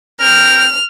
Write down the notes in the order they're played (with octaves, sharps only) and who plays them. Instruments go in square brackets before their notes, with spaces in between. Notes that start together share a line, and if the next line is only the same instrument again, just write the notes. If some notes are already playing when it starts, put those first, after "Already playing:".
[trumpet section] C4 A#4 G5 [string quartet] F6